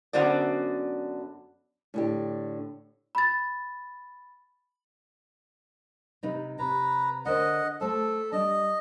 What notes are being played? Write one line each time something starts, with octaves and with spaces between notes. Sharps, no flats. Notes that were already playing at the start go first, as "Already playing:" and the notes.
F#2 D3 B3 F#4 C5 D5
A2 D3 G4
B5 A6
C3 D#4 B4
C3 B4 A#5
D3 A#4 C5 D#5 F#5
A3 A4 C5
G3 D4 D#5